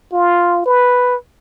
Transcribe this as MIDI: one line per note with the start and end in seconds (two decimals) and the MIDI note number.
0.12 0.63 65
0.66 1.15 71